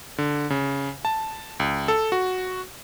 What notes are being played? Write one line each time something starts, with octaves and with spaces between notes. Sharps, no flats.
D3
C#3
A5
C#2
A4
F#4